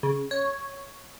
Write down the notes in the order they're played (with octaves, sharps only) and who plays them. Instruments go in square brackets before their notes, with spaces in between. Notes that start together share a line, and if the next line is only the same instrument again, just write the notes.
[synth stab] C#3
C#5